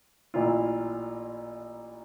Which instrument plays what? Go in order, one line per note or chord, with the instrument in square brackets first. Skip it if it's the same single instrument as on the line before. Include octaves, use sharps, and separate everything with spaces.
[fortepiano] A1 A#2 E4 F4